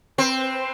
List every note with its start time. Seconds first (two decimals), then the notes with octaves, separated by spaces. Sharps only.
0.18 C4 B4
0.29 C5
0.39 B4